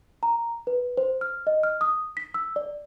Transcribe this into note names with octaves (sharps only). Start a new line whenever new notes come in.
A#5
B4
C5
F6
D#5
F6
D#6
B6
E6
D5